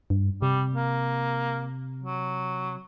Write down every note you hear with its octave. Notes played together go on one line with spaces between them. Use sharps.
G2
C3 G3
A#3
F#3